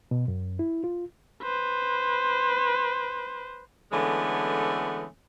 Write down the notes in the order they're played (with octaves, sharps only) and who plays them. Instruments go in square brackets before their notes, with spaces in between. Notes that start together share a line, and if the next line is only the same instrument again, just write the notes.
[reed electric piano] B2
F#2
E4
F4
[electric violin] B4 C5
[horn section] D3 E3 G#3 A3 B3 C#4